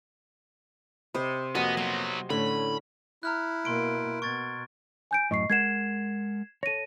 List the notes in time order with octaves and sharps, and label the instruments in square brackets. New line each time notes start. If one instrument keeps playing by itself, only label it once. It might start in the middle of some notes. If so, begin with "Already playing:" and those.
[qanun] C3 C5 [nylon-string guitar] D#5 [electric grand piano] B5
[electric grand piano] F2 A#3 [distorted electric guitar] B3 [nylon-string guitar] F#4 [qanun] D#5 G#5
[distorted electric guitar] F#3 B3 [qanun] C6
[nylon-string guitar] A2 [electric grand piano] D3 [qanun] C#4 [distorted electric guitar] B5
[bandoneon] E4 [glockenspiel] A#5 F6 F#6
[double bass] B2 A#3 [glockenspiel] C6 D7
[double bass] B2 [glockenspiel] C#6 G#6 A6
[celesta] G#5 G6 D7
[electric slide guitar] F#2 A2 [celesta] D#5 C#6 C7
[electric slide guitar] G#3 A#4 F#5 [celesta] G#6 C7 E7
[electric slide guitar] A4 C#5 [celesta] A#6 D#7